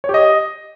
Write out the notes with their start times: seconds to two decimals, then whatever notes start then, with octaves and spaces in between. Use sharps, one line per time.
0.04 C#5
0.09 G4
0.14 D#5